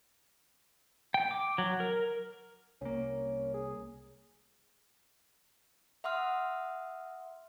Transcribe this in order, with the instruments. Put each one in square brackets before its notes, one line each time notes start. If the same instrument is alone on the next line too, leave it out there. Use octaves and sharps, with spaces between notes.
[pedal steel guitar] G5
D6
F#3
A#4
[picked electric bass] C2 A#3 [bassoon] C#4
[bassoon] G#4
[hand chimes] E5 F#5 C6 D#6 F6